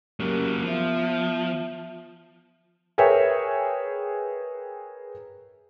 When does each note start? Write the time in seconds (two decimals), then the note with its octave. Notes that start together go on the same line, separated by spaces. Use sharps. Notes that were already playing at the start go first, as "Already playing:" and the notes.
0.20 F#3 A#3 C#4 G4 A#4
0.63 F3 B3 E5
2.98 G#4 A#4 B4 C#5 E5 G5